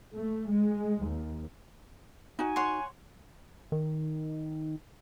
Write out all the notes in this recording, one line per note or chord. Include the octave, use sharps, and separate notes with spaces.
A3
G#3
D#2
D#4 F#4 G#5
C#5 F#5 C6
D#3